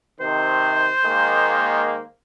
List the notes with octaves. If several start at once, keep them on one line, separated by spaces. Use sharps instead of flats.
C3 D#3 C5
D#3 G#3 A#3